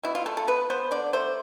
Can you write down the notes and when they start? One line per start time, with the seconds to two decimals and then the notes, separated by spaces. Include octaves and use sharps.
0.03 B2 E4
0.15 F4
0.26 A3 A4
0.37 A4
0.47 B3 B4
0.70 B3 C5
0.91 D3 D5
1.13 A3 C5